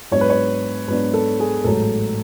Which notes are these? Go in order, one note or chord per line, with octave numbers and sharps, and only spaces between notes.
G#2 F#3 B3 D4 C#5
B4
C#5
G#2 F#3 B3 D4 B4
A4
G#4
A1 G#2 F#3 A3 A4